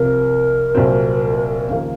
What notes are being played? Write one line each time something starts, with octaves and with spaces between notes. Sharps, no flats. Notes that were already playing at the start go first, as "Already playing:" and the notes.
Already playing: C2 C3 F3 A#4
C2 A#2 F#3 C4
D#2 C#3 F3 A#3